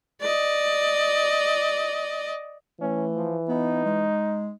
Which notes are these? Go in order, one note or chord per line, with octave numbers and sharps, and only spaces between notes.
D5 D#5
E3 A3 C#4
F3
B3 D#4
G#3